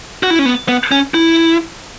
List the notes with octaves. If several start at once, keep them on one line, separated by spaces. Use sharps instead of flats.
F#4
E4
C#4
B3
B3
C#4
E4